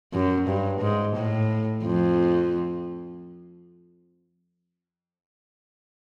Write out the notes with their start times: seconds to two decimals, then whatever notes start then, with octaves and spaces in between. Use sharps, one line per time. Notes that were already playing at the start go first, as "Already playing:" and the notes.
0.14 F#2
0.47 G2
0.81 G#2
1.17 A2
1.85 F2